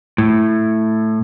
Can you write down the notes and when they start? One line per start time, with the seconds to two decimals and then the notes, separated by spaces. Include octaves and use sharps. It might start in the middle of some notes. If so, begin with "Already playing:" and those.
0.18 A2